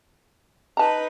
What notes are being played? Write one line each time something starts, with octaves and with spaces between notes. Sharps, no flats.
D#4 B4 A5 A#5